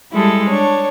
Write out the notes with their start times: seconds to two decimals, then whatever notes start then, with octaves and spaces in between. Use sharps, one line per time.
0.12 G3 G#3 E4 A4
0.48 D4 C#5